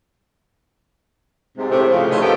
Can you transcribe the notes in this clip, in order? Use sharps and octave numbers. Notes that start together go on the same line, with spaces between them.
G#2 C3
A2 C3
A2 C#3 F3
D#3 A3 F4 B4 C#5 D#5
D#2 D#3 F3 B3 G4 A4